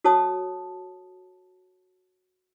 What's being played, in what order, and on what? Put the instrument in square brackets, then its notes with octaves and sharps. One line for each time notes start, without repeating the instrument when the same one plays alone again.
[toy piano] F#4 A4 C#5 A5 D#6